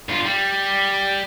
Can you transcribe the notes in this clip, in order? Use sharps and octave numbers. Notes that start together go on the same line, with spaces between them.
G2 F4
G3